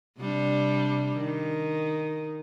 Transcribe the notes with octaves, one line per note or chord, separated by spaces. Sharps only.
C3 G3 D4
D#3